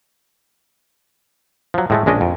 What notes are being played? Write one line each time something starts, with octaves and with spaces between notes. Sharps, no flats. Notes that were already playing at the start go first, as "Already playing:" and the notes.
F3 F#3
A2 G#3 A3
A#1 G#3 C#4 D4 D#5
F2